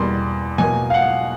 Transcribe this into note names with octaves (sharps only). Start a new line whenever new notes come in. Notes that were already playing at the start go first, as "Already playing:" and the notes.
Already playing: E2 B2 G3 A#3 C6
B2 F#3 A#3 G#5
F5
F#5